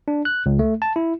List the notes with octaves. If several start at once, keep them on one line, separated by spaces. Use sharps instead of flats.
D4
F#6
C#2
A3
A5
E4